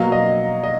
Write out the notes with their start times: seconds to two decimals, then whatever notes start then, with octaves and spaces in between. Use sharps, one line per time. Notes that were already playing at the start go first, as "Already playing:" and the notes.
Already playing: B2 F#3 A#3 F5
0.12 D#5
0.64 D#5